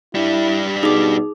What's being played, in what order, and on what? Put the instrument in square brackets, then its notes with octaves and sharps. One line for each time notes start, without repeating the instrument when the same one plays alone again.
[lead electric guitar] G3 D4 [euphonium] E4
[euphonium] B2 [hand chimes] D#4 [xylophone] G#4 D6